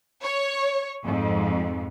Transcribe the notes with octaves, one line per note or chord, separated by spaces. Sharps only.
C#5
F2 G#2